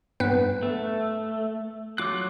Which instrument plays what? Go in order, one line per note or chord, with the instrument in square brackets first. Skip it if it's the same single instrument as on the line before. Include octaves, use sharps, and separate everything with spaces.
[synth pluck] G2 B3 B4
[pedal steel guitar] A3
[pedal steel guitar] F#3 F4 F#6 [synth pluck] D6